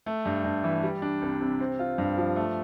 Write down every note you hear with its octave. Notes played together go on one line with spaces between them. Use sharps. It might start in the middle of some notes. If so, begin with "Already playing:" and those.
A3
G2
G2
E3
G3
D4
C2
C3
C4
F4
G2
F3
A3